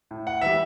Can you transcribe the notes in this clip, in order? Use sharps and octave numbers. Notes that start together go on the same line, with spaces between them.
A2
F#5
E3 G3 E5